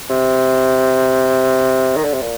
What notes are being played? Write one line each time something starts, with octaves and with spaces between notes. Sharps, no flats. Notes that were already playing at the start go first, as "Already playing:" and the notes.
C3
D#3
D3
C3
A#2